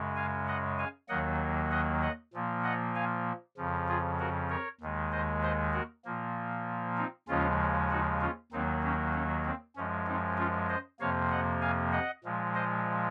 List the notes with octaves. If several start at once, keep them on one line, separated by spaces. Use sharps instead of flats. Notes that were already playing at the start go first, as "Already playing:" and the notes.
Already playing: F#2 C#3 G#3
F5 G#5
D#5 F#5
F5 G#5
D#2 D#3 F#3 A#3 D#5 F#5
D#5 F#5
D#5 F#5
A#2 F3 A#3
D#5 F#5
F5 G#5
F2 C#3 F3
F4 G#4
F#4 A#4
A#4 C#5
D#2 D#3 G#3
C5 D#5
C5 D#5
F#4 A#4
A#2 F3 A#3
C4 D#4
D#2 C#3 F3 G#3 C#4 F4
D#4 F#4
C#4 F4
D#2 D#3 F#3 A#3 C4 D#4
C#4
C#4
C4
F#2 F3 G#3 C#4
C4 D#4
C#4 F4
C5 D#5
F2 C3 F3 A#3 C#5 F5
D#5 F#5
F5 G#5
D#5 F#5
A#2 F3 G#3
C5 D#5